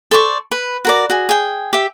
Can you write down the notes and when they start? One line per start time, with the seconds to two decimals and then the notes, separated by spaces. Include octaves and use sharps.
0.11 A4 C5 D5 C#6
0.51 B4
0.85 F#4 A#4 D5
1.10 F#4 G#4
1.29 G#4 G5
1.73 G4 E5